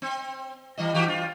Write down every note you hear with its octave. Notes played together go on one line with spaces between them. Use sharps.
C4
E3 G3 D#5
E3 F#4 G4
G2 F4